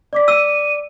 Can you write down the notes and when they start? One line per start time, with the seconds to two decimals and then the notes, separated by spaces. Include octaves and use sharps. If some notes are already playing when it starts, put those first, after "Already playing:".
0.13 D5 D6 B6
0.28 E6 D#7